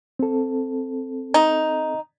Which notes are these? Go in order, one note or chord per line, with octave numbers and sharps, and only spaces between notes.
C4 A4
D#4